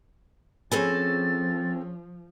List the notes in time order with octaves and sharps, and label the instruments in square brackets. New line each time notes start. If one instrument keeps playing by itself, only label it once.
[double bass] F3 [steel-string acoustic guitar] C4 A4 G#5 [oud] C#4 G#4 B4 [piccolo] A6